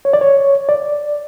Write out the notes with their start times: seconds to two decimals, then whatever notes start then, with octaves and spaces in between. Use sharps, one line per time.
0.05 C#5
0.13 D5
0.21 C#5
0.69 D5